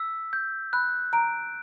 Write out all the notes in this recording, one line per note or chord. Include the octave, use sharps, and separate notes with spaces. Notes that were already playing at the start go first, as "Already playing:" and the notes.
Already playing: E6 B6
G6
B5 F#6
A#5 D7